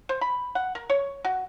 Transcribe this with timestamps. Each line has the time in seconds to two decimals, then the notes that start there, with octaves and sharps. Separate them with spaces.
0.09 C5
0.21 B5
0.55 F#5
0.75 A#4
0.90 C#5
1.25 F#4